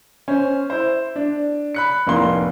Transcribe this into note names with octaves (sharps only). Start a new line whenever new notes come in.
C#4 C5
E4 C5
D4
B5 F#6 C#7
F1 A2 A#3 D#4 C6 G7